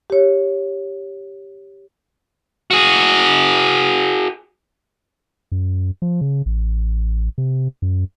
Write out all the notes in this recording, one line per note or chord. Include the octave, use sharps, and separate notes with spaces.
G4 C#5
F#4 G#4
F#2
F3
C#3
A1
C3
F#2